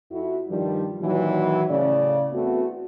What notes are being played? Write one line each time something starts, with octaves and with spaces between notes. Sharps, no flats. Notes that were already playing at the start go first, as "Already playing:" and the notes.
F2 E4 F#4
G2 D#3 F3 G3
A#2 D#3 E3 F#3
A2 C#3 D5
E2 A3 B3 C4 F#4